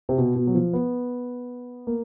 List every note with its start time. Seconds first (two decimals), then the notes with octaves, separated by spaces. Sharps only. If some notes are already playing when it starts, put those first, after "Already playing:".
0.09 C3
0.18 B2
0.36 B2
0.47 F#3
0.55 F3
0.73 B3
1.87 A#3